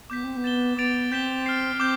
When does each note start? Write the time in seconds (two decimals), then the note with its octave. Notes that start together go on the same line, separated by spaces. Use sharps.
0.10 B3 D6 G6 B6
0.24 C4
0.37 B3
0.44 A6 E7 G7
0.77 B3 D6 A6 D7 F7
1.11 C4 G6 B6 E7 G7
1.46 F6 A6 C7
1.79 C4 D6 G6